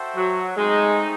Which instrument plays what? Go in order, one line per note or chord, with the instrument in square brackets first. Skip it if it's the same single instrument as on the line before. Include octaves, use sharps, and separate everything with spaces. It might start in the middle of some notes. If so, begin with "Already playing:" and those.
Already playing: [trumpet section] F#4 A4 C5 E5 G5
[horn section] F#3
[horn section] G#3 [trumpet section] A3 C4 D#4